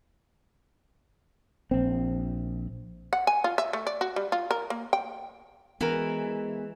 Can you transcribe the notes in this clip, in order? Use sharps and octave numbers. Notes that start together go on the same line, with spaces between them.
A#1 C4
F#5
G#5
F4
E5
A3
D5
F#4
G3
F4
A#4
A#3
G5
E3 G#3 B3 F#4 A#4